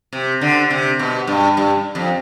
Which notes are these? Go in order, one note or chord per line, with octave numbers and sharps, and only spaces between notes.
C3
D3
C3
B2
G2
G2
F2